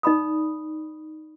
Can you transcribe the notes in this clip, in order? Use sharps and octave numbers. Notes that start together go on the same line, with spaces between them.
D#4 D5 B5 D#6